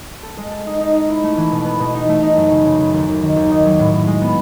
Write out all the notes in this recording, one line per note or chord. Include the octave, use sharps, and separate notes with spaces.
A4
G#3
A4
D#4
D#4
D#4
E4
A3
E3
B2
B3
B2
D#4
A3
D#4
F#2
C#3
C#3
C#3
D#2
D#2
D#3
D#2
D#4
F#3
A2
A2
G#3
B3